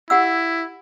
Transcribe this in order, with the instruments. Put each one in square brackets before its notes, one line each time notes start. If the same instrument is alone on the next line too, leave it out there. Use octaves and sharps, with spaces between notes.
[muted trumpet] E4 [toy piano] G4 F#5 E6